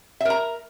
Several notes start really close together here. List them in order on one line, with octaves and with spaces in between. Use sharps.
E5 A#4 A#5